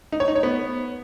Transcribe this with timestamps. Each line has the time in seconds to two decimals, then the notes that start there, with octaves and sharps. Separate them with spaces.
0.12 D#4
0.20 C#5
0.28 D#4
0.36 C#5
0.43 B3